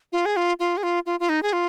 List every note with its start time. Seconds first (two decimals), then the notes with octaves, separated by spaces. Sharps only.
0.12 F4
0.26 G#4
0.37 F4
0.60 F4
0.77 G#4
0.83 F4
1.06 F4
1.20 F4
1.29 D#4
1.43 G#4
1.53 F4